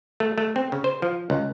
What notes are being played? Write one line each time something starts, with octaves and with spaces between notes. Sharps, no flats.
A3
A3
C4
C#3
C5
F3
C#2